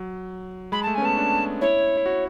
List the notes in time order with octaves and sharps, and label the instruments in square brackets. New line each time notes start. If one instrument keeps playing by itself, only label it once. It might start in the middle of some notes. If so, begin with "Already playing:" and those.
Already playing: [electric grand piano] F#3
[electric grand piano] G#3 [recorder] B5
[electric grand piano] A3 [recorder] A5
[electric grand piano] C#4 [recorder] G#5
[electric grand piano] B3 [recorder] A5
[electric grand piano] D4
[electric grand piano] E4 [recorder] C#5
[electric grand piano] E4
F#4